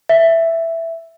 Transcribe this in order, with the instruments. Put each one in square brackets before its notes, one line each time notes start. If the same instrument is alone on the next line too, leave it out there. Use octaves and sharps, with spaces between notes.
[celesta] E5